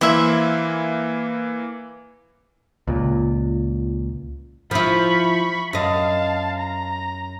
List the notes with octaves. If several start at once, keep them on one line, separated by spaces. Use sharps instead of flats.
E3 A#3 E4 C5 E5
C#2 A#2
F3 E4 B5 C#6
F#2 D#5 F5 A5
A#5